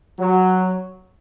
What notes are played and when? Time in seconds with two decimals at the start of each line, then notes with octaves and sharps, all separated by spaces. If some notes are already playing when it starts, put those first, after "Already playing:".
0.19 F#3